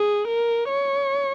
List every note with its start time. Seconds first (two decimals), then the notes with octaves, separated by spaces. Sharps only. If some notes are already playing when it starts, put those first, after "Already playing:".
Already playing: G#4
0.28 A#4
0.69 C#5